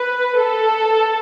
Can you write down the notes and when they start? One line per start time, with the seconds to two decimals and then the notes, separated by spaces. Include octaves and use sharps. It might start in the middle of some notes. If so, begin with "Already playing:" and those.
Already playing: B4
0.39 A4